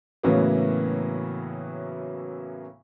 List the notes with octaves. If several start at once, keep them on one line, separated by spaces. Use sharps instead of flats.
A2 C#3 E3 F#3 A#3 B3